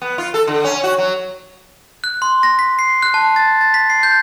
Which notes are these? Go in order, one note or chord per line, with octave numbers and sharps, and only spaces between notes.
B3
F4
A4
D3
C#4
F#4
F#3
F#6
C6
A#6
B6
C7
F#6
A5
A6
A6
B6
C7
G6